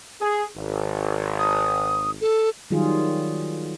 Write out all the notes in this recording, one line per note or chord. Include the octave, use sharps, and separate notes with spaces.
G#4
G#1
D#6
A4
D#3 F#3 G3 F4 G#4